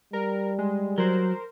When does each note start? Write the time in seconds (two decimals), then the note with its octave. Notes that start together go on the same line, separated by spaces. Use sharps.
0.13 G3 A#4
0.59 G#3
0.98 F#3 A#4 C5